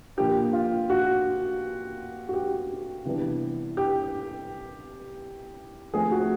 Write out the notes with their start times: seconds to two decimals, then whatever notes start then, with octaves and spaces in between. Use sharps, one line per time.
0.17 A#2 F3 A#3 D4 G4
0.53 F4
0.90 F#4
2.29 F#4
2.33 G4
3.05 C3 E3 G3 B3 D4
3.77 G4
5.93 F3 A3 C4 G#4
6.12 F#4